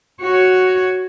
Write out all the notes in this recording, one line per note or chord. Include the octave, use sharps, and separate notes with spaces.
F#4 C#5